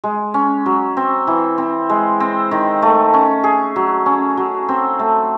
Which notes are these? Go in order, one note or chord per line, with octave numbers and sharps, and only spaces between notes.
G#3
C#4
F#3
C4
E3
C4
G#3
C4
D#3
A3
C#4
G#4
F#3
C#4
F#3
C4
A3